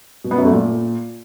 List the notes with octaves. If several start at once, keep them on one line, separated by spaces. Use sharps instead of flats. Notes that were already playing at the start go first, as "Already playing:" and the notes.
B2
B3
F#2
A3
A#2